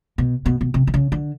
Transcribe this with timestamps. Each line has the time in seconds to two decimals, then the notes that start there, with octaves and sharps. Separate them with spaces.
0.18 B2
0.46 B2
0.61 B2
0.74 C3
0.87 C3
0.94 C#3
1.12 D3